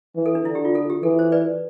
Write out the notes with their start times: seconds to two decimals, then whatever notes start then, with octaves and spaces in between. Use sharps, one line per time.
0.16 E3
0.26 A4
0.35 D4
0.45 D3 E4
0.55 G4
0.65 F4
0.75 A4
0.90 G4
1.03 E3 A4
1.19 C5
1.32 B4 D5